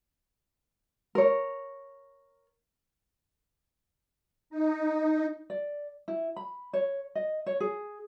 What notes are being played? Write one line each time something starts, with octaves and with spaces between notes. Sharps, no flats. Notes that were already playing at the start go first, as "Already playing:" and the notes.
A#4 C#5
D#4
D5
E4
B5
C#5
D#5
C#5
G#4